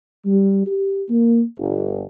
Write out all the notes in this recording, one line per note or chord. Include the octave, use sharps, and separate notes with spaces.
G3
G4
A#3
G1